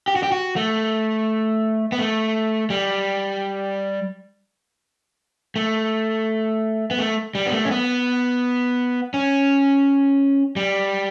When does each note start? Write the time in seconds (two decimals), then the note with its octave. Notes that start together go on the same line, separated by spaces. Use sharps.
0.08 G4
0.16 F#4
0.23 G4
0.32 F#4
0.56 A3
1.92 B3
1.99 A3
2.70 G3
5.56 A3
6.91 B3
6.99 A3
7.35 G3
7.46 B3
7.53 A3
7.65 C#4
7.71 B3
9.14 C#4
10.56 G3